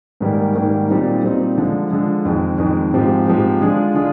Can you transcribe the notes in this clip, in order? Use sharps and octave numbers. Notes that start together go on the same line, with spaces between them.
G#2 D#3 G3 A#3
G#2 D#3 G3 A#3
A#2 G3 C4 D#4
A#2 G3 C4 D#4
D3 F3 G#3
D3 F3 G#3
F2 D#3 G#3
F2 D#3 G#3
G#2 F3 G#3 C4 G4
G#2 F3 G#3 C4 G4
D3 G#3 D4 F4 G#4
D3 G#3 D4 F4 G#4